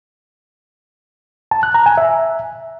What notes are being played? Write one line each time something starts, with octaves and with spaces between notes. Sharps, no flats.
A5
F#6
A#5
G#5
E5